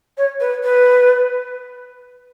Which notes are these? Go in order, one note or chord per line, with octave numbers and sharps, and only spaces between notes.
C#5
B4
B4